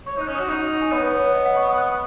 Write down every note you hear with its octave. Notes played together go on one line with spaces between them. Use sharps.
C#5 C#6
D#4 F#6
C#4
F#4 D#6
D#4 F#6
C#6
G#5
B3 C#5
B4
C#5
C#5
D#5
F#5
C#6
D#6
F#6